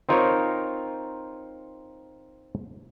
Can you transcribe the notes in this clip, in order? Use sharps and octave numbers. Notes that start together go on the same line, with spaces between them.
C4 D#4 F4 A#4 C5 C#5